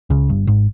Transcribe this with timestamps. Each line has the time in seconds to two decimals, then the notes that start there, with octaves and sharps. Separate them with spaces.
0.10 C#2 C#3
0.29 G1 G2
0.47 G#1 G#2